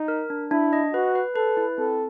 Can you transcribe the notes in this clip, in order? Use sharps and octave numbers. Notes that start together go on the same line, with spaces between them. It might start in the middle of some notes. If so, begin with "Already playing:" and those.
Already playing: D#4
A#4
D4
D4 E4
D#5
F#4 B4
B4
A4 B4
E4
C4 A4